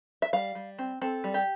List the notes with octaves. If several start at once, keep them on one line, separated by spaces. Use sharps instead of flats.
E5
G3 F5
G3
C4
C4 A4
G3
G4